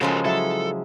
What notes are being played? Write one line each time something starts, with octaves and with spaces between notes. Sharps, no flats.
C#3 F3 G#3 F#4 A4 A#4
F#3 E4 A4